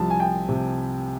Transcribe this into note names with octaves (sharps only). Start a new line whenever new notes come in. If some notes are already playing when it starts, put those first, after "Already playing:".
Already playing: C2 C3 F3 A5
G#5
G5
C3 F3